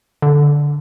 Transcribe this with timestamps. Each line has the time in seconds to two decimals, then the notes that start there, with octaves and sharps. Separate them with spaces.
0.22 D3